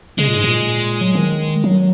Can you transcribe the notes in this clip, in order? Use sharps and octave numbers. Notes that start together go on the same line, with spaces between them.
C#3 G#3
A#2
G#2
A#2
F#3
D#3
F#3